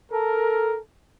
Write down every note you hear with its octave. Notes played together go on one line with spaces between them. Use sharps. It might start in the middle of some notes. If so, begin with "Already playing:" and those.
A4 A#4